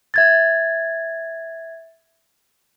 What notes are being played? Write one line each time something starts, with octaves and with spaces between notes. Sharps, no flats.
E5 G#6 A6